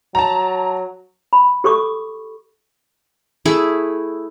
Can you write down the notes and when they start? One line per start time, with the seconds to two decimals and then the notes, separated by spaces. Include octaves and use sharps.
0.15 F#3 A5 A#5
1.33 B5
1.64 G4 A4 C#6 D6
3.45 A3 E4 G#4